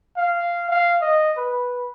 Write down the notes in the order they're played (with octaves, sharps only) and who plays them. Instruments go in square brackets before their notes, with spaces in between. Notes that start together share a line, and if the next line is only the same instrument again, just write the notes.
[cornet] F5
F5
D#5
B4